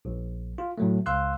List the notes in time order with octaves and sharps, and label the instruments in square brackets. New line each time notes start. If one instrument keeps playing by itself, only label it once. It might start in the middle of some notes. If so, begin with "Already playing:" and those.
[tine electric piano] A#1
F4
A2 F#3 A3
C#2 F5 C6 E6 F#6